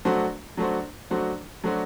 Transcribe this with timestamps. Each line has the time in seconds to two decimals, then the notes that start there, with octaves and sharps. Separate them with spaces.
0.05 F#3 A3 D4 F#4 C5
0.57 F#3 A3 D4 F#4 C5
1.10 F#3 A3 D4 F#4 C5
1.64 F#3 A3 D4 F#4 C5